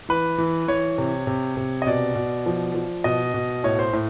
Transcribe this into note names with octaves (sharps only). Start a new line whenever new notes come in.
E3 B4
E3
E3 C#5
C3
C3
C3
D#5
B2 D5
B2
F3
F3
B2 D#5
B2
A2 C#5
C5
A2